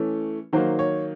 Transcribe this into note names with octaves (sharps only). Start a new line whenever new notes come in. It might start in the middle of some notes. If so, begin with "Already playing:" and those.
Already playing: E3 A3 C#4
D#3 F#3 A#3 C5
C#5